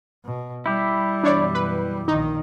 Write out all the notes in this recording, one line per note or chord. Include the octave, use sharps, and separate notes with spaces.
B2
G3 E4 G4
F#2 B2 E3 D4 C#5 D5
B4
A#1 D#3 D#4